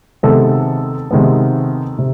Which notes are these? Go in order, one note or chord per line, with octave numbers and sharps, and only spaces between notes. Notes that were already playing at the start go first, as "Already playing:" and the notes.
C3 D#3 G#3 B3 A4
C3 D#3 G#3 B3
C3